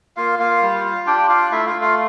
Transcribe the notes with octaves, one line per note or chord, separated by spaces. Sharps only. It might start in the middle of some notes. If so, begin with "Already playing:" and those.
A#3 F4 F5
A#3 F4 F5
G3
F4
D4 G4 G5
F4 F5
A3 E4 E5
F4 F5
A3
F4 F5